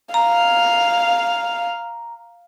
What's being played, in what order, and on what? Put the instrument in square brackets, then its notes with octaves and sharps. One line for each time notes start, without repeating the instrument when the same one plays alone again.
[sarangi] F5 [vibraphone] A#5